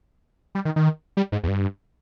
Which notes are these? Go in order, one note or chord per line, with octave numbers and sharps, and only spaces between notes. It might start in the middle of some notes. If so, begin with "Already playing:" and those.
G3
D#3
D#3
G3
G#2
E2
G2